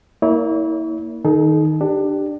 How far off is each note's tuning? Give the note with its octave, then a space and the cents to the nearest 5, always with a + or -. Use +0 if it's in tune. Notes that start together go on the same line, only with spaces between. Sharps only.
A#3 +0 E4 -30 C#5 +40
D#3 +0 D#4 +0 A4 -45
D4 +20 G4 -5